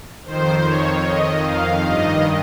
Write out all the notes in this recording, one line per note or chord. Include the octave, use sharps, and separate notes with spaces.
F2 D#3 C5
C#5
D#5
F5
G2 D#3 D#5